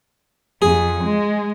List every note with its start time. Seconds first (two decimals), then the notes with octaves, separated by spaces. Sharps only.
0.62 F2 G#4
1.04 G#3